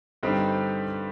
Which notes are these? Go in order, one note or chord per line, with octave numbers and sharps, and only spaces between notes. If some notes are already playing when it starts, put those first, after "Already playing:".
G2 D3 G3 C4 D#4